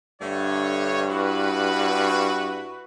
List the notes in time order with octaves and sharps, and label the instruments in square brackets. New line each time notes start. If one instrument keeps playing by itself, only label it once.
[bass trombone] G2 [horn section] D3 A3 C#5
[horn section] E4 F#4 B4